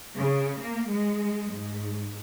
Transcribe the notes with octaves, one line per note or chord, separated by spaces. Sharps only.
C#3
A#3
G#3
G#2